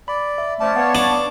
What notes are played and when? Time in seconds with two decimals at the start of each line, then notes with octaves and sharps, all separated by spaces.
0.08 D5 B5
0.38 E5
0.60 F3 A3 C#4 D5 A5
0.76 B3 C#5 F5
0.95 D4